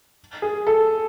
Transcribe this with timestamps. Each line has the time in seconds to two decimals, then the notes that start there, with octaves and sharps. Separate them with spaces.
0.42 G#4
0.67 A4